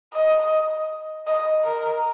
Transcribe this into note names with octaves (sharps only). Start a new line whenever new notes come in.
D#5
D#5
A#4